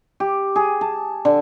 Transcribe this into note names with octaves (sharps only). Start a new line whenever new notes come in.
G4
G#4
A5
D3